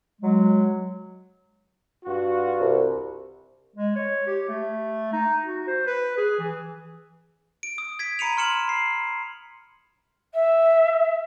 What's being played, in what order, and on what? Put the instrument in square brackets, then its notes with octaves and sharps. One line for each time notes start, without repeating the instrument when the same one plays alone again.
[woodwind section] F#3 G#3
[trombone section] G2 F4 F#4
[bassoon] C2
[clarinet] G#3
C#5
G4
A3
D#4
F#4
C5
B4
G#4
E3
[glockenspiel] D7
D#6
G#6 B6 D7
A#5 B5 C#7 D#7 F7
C6 F6 C#7 E7 F#7
B5 C7
[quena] E5